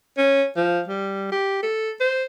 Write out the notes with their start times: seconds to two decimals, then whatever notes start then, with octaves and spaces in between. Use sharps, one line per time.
0.18 C#4
0.56 F3
0.88 G3
1.32 G4
1.63 A4
2.00 C5